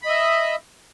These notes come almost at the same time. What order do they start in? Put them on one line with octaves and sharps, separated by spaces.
B5 D#5 E5